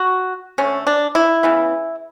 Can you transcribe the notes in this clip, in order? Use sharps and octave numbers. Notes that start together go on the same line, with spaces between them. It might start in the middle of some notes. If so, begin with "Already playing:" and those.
Already playing: F#4
D3 A3 C#4
D4
E4
C#3 E3 B3